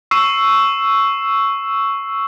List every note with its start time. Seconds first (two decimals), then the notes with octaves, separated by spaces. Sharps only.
0.11 C#6 E6 C7 E7